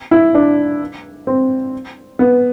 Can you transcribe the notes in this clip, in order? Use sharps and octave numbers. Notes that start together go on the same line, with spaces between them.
E4
D4
C4
B3